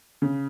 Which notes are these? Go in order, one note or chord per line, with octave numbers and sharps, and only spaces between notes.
C#3